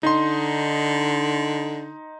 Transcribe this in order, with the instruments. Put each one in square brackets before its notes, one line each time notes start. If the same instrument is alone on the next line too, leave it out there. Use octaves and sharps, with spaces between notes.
[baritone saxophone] D3 [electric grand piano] D#4 C6